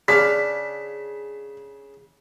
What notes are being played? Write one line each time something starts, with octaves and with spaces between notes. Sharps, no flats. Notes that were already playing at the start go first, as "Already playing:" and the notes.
C#3 D4 F5 B6